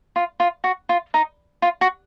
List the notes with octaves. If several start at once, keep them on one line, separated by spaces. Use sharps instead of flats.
F4
F4
F#4
F4
D#4
F4
F#4